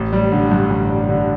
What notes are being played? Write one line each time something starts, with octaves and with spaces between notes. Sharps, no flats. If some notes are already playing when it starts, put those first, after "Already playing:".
Already playing: A1
G3
D3
G2
A1
G3
D3